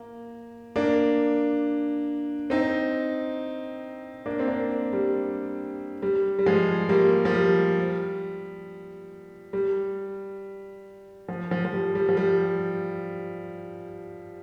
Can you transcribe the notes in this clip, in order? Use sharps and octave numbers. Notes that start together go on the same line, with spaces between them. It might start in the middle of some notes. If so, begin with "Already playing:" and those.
Already playing: A#3
A#3 D4
C4 D#4
A#3 D4
C4
A#3 D4
G3
G3
G3
F3 G#3
G3 A#3
F3
G3
G3
F3
F3
F3
G3
G3
F3
G3